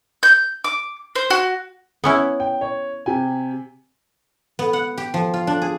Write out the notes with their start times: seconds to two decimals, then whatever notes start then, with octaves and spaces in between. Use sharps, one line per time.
0.23 G6
0.64 D6
1.15 C5
1.30 F#4
2.04 B3 C#4 E4
2.40 G5
2.61 C#5
3.06 C3 G5 G#5
4.59 B3
4.73 F#5
4.98 G4
5.14 F3
5.34 F4
5.47 D4
5.62 G#4